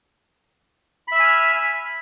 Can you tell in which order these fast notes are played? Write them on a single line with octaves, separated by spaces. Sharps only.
B5 E5 E6 G#5 F6